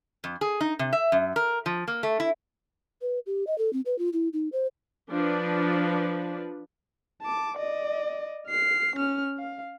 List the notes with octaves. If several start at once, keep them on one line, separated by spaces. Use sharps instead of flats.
F2
G#4
D#4
C3
E5
F#2
A#4
F3
A#3
A3
E4
B4
G4
D#5
A4
C4
B4
F4
E4
D#4
C5
F3 D4 B4
A5 D6
D5 D#5
F6 C7
C#4 F6
F5